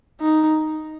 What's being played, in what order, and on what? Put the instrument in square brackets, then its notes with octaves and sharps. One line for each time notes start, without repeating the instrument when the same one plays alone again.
[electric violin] D#4